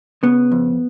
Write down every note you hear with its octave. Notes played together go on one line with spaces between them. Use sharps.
C#3 B3
F2